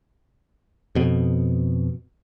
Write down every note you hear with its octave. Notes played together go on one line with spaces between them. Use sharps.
F2 B2